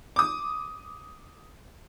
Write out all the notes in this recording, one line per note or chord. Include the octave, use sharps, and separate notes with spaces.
D6 D#6